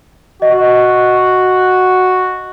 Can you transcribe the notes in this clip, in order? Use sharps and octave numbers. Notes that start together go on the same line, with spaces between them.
F#4 D#5